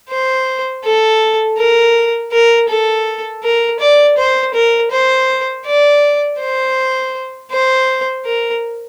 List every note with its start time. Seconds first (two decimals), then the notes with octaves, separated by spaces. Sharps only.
0.09 C5
0.84 A4
1.58 A#4
2.33 A#4
2.69 A4
3.43 A#4
3.80 D5
4.18 C5
4.54 A#4
4.91 C5
5.66 D5
6.40 C5
7.51 C5
8.26 A#4